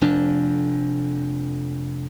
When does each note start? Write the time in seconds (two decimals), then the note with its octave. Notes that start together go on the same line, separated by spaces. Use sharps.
0.01 F1 F2 D4